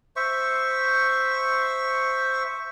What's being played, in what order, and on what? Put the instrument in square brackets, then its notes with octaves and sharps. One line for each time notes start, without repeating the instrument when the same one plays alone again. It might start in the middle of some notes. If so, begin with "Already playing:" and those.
[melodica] C5 E5 C#6